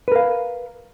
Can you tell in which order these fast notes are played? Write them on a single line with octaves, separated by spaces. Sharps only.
B4 A#4 F5